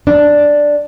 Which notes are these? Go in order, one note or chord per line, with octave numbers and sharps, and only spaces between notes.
D4